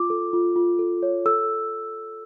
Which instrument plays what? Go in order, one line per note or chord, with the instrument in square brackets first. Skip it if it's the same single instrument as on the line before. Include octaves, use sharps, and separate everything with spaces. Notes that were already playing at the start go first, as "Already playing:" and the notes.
Already playing: [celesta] F4 D6
A4
F4
F4
A4
C#5
A4 E6